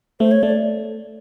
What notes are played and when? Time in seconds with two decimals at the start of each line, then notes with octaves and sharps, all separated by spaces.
0.20 A3 C5
0.31 C#5
0.43 A3 D5